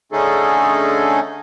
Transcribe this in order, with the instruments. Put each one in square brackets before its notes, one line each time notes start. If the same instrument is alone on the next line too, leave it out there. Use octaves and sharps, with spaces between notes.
[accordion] D3 A3 C#4 D#4 G#4 A4